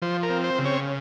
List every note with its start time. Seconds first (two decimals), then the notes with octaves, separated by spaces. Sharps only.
0.02 F3 C5
0.23 A#4
0.30 C4
0.44 C5
0.59 C#3
0.65 C#5